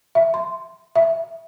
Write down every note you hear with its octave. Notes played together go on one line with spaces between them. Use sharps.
E5
C6
E5